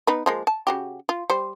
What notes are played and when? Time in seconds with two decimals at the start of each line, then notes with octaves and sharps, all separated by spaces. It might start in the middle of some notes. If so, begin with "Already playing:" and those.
0.07 B3 D#4 B4
0.26 F3 G#3 A#3
0.47 A5
0.67 C#3 F#4 G4
1.09 F4
1.30 G3 C5